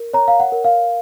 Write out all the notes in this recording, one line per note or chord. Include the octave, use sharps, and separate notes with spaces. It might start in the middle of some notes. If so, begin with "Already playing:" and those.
Already playing: A#4
C#5 A#5
F5
F#5
A#4
F5